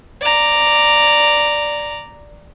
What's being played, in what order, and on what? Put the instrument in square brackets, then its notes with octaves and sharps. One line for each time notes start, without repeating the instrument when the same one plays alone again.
[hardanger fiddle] D5 A#5